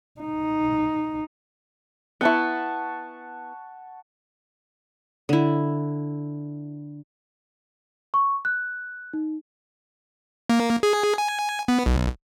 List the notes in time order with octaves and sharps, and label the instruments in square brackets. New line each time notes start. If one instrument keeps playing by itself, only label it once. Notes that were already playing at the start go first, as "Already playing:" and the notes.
[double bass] D#4
[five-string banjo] B3 E4 [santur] F#5 A5 C#6
[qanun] D3 E4
[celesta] C#6
F#6
D#4
[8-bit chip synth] A#3
G#4
G#5
B3
B1